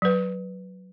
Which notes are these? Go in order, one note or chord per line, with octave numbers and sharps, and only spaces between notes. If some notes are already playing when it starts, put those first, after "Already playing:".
F#3 B4